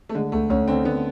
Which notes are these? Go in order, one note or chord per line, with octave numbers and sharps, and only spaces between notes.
A3
D3 G#3
D2 A3
D2 C#4
D3 C4
D3 B3